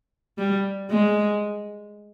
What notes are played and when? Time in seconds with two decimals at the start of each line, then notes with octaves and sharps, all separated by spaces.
0.38 G3
0.91 G#3